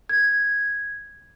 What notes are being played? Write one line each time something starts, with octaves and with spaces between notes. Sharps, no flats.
G#6